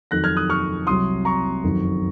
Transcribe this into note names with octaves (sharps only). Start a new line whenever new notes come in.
F2 D#3 F#3 F#6 A#6
F6 G#6
D#6 F#6
C#6 F6
C2 C3 F#3 C6 D#6
A#5 C#6
F#1 F2 D#3 F#3